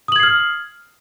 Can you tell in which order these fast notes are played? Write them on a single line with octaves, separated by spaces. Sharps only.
D#6 F#7 G#6 C7 F6